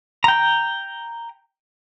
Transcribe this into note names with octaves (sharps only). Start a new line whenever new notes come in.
G5 A#5